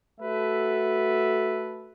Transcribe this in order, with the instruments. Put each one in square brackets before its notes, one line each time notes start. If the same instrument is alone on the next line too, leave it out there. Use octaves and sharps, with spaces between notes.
[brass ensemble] A3 F#4 A4 B4 E5